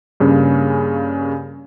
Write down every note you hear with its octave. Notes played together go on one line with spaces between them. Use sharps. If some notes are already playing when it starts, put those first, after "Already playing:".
G2 C#3 A#3 C#4